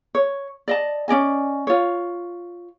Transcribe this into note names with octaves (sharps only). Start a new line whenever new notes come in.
C#5
D5 D#5 A5
C#4 D5 D#5 G#5
F4 C#5